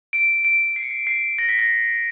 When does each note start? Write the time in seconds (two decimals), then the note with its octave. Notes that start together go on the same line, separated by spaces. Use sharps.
0.13 D7
0.45 D7
0.76 C7
0.83 C#7
0.91 C7
1.07 C7
1.39 A#6
1.49 B6
1.59 A#6